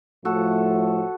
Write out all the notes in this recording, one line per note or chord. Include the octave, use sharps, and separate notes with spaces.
A2 F3 A3 F#4 A4